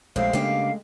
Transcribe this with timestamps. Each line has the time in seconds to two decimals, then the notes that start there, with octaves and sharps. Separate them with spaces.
0.16 A#1 G#3 A3 C4 G4 F5
0.33 C#3 A#3 D4 G4